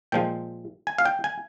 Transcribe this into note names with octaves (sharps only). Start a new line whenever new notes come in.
A#2 F3 G#3 G5
G#5
F5
G5
G#5